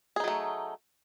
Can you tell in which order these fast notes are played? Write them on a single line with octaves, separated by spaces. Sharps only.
G#4 D#4 F#3 A3